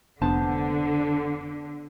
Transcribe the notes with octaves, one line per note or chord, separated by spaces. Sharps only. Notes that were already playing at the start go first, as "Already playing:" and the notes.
F1 D3 B3 D4 C5 A5